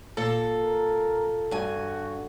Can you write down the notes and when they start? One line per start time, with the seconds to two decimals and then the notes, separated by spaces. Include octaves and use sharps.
0.17 A#2 A4
0.63 A#4
1.51 G2 F#4 G#5